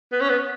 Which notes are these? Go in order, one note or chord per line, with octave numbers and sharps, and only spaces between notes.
B3
C#4
B3